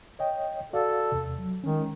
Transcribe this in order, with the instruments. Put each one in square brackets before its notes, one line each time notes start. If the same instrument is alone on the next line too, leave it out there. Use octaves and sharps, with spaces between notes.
[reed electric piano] C#5 D#5 G5
[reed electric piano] F#4 D5 F5 [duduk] A4
[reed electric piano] E2 C3
F#3
[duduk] D#3 [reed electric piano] G#3 C#4